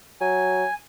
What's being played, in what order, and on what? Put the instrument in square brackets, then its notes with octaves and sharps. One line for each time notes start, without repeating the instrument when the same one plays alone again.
[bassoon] F#3 [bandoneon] G#5